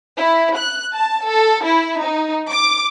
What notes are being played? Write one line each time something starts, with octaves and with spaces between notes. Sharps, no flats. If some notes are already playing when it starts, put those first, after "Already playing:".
E4
F#6
A5
A4
E4
D#4
D6